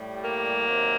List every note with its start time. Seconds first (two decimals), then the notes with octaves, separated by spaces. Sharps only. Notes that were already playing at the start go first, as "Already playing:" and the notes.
Already playing: A2 G3
0.24 A#3
0.64 C3 D#3 F#3